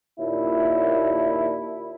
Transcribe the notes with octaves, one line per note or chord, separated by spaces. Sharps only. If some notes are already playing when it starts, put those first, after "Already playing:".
D#2 A#2 D4 E4